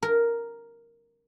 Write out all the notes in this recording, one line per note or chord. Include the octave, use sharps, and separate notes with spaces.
A#4